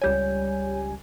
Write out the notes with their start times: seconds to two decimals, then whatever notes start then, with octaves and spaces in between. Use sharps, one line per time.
0.02 C#2 G3 C#5 G#5 G6